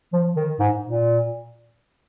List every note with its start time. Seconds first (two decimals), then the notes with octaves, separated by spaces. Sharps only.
0.13 F3
0.36 D#3
0.59 G#2
0.83 A#2